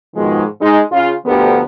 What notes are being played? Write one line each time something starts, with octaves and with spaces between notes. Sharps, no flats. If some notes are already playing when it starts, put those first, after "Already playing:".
G#2 B2 D#3 F3 G#3
G#3 D#4
C#3 F4
D2 D3 F3 B3 G4 A#4